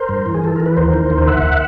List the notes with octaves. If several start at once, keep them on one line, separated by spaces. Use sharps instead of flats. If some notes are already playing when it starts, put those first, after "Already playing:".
Already playing: A#4 C5
G2
E3
G#4
E3 A4
E3 A#4
B4
D#2 A#4 C5
D#3
D#2
D2 E5 F#5